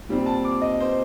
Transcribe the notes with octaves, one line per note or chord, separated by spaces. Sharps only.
A#2 G3 C4
A5
D6
D#5
C5